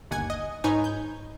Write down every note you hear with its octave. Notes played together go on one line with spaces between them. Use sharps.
G1 D#2 F#5 G#5 G#6
D#5
G#2 D#4 B4 C#5 G#5 G#6
G6